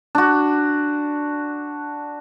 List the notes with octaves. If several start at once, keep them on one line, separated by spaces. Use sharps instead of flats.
D4 F#4